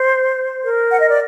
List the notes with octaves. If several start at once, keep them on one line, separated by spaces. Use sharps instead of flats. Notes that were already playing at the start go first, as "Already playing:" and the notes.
Already playing: C5
A#4
F#5
D#5
D5